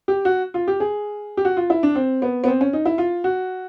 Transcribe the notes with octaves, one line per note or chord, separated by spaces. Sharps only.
G4
F#4
F4
G4
G#4
G4
F#4
F4
E4
D4
C4
B3
B3
C4
C#4
D#4
E4
F4
F#4